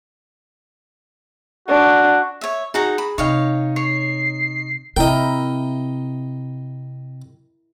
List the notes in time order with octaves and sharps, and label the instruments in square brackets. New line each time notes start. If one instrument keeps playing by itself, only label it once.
[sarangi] D4 [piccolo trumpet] F#4
[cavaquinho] C#5 E5
[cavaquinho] D#4 F#4 A#5 [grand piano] G#4
[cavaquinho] B5
[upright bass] C3 [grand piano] D#4 D#5 [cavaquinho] C#5 F5 G5
[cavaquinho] C#5 [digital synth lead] C7
[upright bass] C3 [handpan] E4 A#4 [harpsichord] D#5 G5